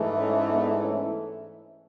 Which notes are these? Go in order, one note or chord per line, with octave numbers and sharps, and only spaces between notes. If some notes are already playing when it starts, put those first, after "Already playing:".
Already playing: G#2 E3 A3
C#4
B3 D4
C#4 E4